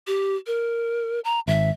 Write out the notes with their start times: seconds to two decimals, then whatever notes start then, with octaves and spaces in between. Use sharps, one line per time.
0.07 G4
0.47 A#4
1.25 A#5
1.48 G#1 E5